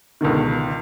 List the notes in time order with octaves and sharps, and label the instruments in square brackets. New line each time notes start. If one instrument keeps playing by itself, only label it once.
[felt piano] C#2 B2 D3 D#3